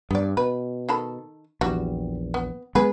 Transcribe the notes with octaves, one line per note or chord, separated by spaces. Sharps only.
G2 B3 D5
B2 B4
D#3 A4 B5
A#1 E2 G3 F#4
B3
G#3 B3 G#4 B4